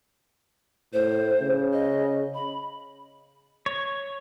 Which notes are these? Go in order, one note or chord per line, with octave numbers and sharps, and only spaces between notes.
A2 C5
C#3
D#5
B5
C#5